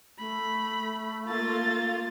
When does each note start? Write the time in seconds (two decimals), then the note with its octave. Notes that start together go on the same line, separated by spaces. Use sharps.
0.19 A3 B5
1.29 A#3 F4 A6